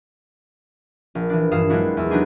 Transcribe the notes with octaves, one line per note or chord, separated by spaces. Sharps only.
A#1
E3 D4
G2 A#2 E3 F5 D#6 E7
F#3 G#3 C4 D4 E4 F#4
E2 E6
F#3 B3 D4 D#4 G4 G#4